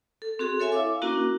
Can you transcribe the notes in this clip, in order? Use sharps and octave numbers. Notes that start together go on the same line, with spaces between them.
A4
C4 F#4 G#4
A4 C#5 E5 G#5
E4 F5 D6
A#3 C#4 D4 E4 F#4 A#4